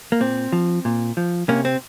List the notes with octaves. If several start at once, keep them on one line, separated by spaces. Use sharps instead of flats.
A#3
A#2 C4
F3
A#2
F3
C3 A#3 C#4
C4